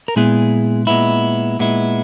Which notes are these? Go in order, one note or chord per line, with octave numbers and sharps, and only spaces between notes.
A#4
A#2 G#3 B3 E4 G#4
A#2 G#3 B3 E4
A#2 G#3 B3 E4